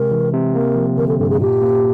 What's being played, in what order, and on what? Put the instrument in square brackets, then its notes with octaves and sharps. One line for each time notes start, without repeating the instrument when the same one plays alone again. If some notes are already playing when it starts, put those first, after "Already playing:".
Already playing: [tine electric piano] C3 G#3 [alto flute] A#4
[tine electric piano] E3
C3
[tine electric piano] A#3 [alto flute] A#4
[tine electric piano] F3
[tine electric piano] D3 [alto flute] A#4
[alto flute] A4
[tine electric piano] G2 [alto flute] A4
[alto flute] G#4
[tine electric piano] A#2 [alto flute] G4
[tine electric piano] A#3